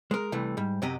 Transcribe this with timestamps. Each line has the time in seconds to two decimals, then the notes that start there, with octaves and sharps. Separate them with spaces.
0.11 G#3 A#4
0.32 C2 C3 E3 A3
0.57 G#2 G3
0.82 F#2 C3 F#3 G4 D#5 A#5